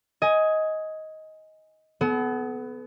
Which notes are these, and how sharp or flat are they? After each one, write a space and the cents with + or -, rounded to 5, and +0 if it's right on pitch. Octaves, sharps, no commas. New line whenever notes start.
D#5 +15 G#5 +0
B3 +15 A4 -40